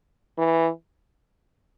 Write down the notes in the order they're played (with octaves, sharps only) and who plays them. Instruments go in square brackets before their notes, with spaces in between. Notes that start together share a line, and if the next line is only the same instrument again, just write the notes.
[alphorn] E3